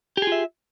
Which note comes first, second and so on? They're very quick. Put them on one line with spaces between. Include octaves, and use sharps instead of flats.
G4 G#4 F4 E5